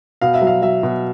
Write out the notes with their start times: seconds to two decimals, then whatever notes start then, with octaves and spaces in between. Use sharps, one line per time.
0.21 B2 F5
0.34 E5
0.41 F#3
0.47 F5
0.62 F#3 E5
0.83 B2